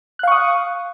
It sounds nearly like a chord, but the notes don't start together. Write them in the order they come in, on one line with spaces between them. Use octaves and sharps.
F#6 F5 C#6 D#6